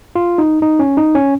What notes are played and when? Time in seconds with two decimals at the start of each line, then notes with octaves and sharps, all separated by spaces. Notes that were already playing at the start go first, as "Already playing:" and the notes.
0.16 F4
0.38 D#4
0.62 D#4
0.79 C#4
0.97 D#4
1.15 C#4